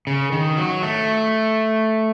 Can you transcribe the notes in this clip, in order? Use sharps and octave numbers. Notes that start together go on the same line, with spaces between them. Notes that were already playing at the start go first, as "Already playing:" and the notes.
C#3
D#3
F#3
A3